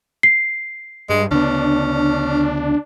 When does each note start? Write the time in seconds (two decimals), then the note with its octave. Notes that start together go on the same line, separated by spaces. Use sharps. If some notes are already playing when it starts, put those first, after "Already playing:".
0.23 C7
1.09 G2 G#3
1.31 D2 C#3 B3 C#4 D4